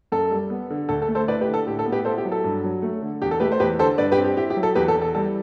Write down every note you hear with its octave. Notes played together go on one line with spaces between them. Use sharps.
F#2 A4
G3
B3
D3
D2 A4
A4
A3
A4 C5
E4 B4 D5
G4 B4
D3
A4
A2 G4
A4
B3
G4 B4
E4 A4 C5
G4
F#3
A4
G2
F#3
A3
D3
E2 G4
A4
A3 G4 B4
C5
E2 G4 B4
D3 A4 C5
G2 B4 D5
G4 B4
C4
G4
E4 G4
G4
F#3
A4
E2 G4 B4
A4
E3
A4
G3 A4